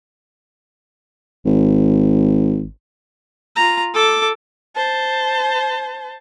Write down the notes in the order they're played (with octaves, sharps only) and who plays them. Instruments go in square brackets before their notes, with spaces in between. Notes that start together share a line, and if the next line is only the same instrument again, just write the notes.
[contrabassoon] G#1
[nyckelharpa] F4 A#5
A4 D6
[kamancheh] C5 A5